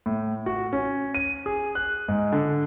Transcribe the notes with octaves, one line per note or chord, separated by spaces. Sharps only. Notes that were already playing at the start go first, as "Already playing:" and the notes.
A2
F#4
C#4
D#7
G#4
F#6
G#2
D3